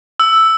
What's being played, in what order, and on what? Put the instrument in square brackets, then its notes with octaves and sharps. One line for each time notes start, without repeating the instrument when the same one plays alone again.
[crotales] E6